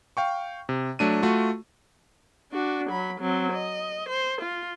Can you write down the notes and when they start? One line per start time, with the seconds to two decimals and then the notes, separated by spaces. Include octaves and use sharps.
0.17 F5 G5 C#6
0.69 C3
0.99 F#3 A3 D4 D#7
1.22 A3 F4 F#4
2.52 D4 F#4
2.90 F#3 B5
3.21 F#3 C4
3.53 D#5
4.09 C5
4.42 F4